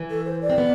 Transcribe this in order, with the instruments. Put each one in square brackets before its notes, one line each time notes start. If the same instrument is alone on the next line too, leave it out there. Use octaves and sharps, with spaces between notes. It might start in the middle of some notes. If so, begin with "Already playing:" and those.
Already playing: [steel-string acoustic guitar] E3
[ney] A4
C5
D5
[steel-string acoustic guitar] C4
B3